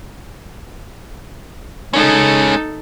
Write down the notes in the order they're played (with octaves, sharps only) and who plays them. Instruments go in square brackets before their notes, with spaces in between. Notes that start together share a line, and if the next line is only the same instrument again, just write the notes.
[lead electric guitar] G#3 C#4 [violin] D#4 A4